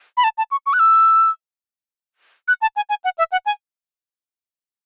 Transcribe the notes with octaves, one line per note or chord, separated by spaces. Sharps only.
B5
A5
A5
C#6
C#6
F#6
E6
F#6
A5
G#5
G#5
F#5
E5
F#5
G#5